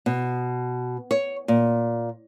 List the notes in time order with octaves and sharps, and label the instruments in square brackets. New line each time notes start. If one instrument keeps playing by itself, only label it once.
[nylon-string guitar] B2
C#5
A#2